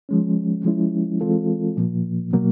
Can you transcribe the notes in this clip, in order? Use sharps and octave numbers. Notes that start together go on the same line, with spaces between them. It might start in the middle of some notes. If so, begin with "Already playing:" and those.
F3 G#3 C#4
F3 G#3 C#4 E4
E3 G#3 C4 F4 A4
A#2 F3 A#3
B2 F#3 A#3